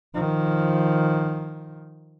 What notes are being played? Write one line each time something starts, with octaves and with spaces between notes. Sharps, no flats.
D#3 F3